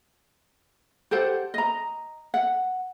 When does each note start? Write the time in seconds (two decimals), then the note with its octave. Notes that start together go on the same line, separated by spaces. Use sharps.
1.11 G4 A4 C5 F#5
1.54 D#5 A#5
2.34 F#5